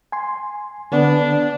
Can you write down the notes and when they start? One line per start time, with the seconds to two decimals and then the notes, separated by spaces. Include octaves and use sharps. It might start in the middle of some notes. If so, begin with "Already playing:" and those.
0.12 G#5 C6
0.92 D3 B3 D4